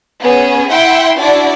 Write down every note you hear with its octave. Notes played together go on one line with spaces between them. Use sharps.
B3 C#4 G#4
E4 E5 F#5 G5 C6
D4 E4 F#4 D5